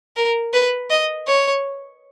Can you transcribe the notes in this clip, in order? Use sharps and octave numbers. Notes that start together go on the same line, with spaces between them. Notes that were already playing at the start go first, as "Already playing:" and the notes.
A#4
B4
D#5
C#5